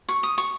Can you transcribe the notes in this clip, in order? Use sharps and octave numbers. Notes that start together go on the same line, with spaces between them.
C#6
D#6
C#6